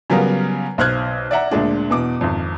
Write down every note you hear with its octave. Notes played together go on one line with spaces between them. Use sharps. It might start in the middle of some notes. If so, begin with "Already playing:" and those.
C#3 F#3 G3 B3 F4 A#4
B1 C5 F6 F#6 G#6
D5 E5 F#5 A#5
D2 A#2 G#3 D4
E2 B2 D6
G#1 F2